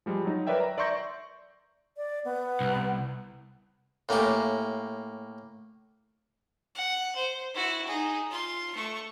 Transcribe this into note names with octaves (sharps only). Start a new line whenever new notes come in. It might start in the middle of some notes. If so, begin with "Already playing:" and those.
F3 G3 G#3
F#3 D#4
A#4 B4 C#5 D5 E5 G5
A#5
D5 E5 C6 C#6 G6 A#6
D5
B3
C2
A2 A#3 C#4 G4
F#5
C5
E4 F#4
D#4 G#4
F4 C6
A3 C#6